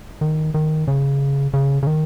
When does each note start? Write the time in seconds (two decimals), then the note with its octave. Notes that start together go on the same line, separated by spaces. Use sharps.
0.21 D#3
0.54 D#3
0.88 C#3
1.53 C#3
1.83 C#3
1.87 D#3